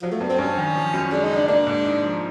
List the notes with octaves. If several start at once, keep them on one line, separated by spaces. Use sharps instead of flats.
F3 F#3
A3
G2 B3
C4
G2 C#4
D#3
F3
F#2
G#3 D4
D#4
C#3
D4
A#3 D4
G#2
D#4
F3